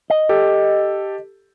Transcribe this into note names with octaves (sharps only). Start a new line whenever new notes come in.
D#5
G4 A4